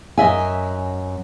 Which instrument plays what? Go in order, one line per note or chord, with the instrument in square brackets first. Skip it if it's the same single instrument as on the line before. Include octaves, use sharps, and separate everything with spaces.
[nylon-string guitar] F#2 D#5 E5 G#5